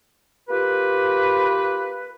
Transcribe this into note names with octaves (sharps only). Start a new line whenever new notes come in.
A#3 F4 G4 B4